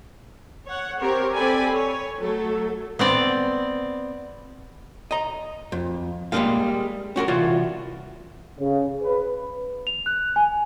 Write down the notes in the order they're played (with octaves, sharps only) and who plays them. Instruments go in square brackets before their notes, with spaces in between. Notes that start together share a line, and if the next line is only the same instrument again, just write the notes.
[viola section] C#5 F#5
C4 G4 A#4 C5 C#5
C4 A4 D5 G#5 B5
C#5
F#3 A3 A4
[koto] B3 C4 D5
[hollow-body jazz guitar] D#5 A#5
F2
G3 G#3 A#3 D#4 G#4 F5
C#4 F#4 G#4 A#4
C2 E3 F4 F#4 D5
[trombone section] C#3
B4
[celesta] F7
F#6
G#5